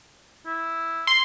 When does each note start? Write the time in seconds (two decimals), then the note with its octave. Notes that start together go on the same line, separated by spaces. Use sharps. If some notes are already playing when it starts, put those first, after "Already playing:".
0.46 E4
1.07 C6